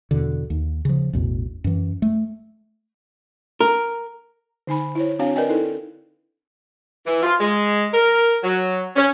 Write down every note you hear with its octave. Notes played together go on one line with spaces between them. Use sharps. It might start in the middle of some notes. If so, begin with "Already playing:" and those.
E2 B2 D3
D#2
C#3 F3
A1 E2 B2
F#2 E3
A3
A#4
D3 D#4 G#5 B5
E4 C5 C#5
C4 D4 F#4 C#5 F5 G#5
A#4 B4 D5 D#5 G5 G#5
D#4 E4 A4
E3
F4
G#3
A#4
F#3
C#4